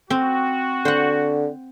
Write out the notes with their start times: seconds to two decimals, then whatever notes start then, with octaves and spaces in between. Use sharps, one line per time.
0.10 C4 F#4
0.85 D3 C5 F#5